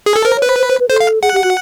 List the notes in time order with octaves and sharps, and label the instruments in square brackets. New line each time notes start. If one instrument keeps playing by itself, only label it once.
[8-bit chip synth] G#4
A4
[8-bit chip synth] A#4 [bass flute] C5
[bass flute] C#5
[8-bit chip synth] B4
[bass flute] C5
C5
C5
B4
[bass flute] A4 [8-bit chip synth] C5
[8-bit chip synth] F5
[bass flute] G#4 [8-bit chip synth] F#5
[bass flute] G4
F#4